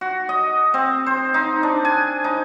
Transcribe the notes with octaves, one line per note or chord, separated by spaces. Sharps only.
F#4
D#5
C4
C5
D#4
D4
G#5
D#4